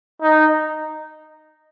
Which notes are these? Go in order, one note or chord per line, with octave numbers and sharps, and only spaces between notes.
D#4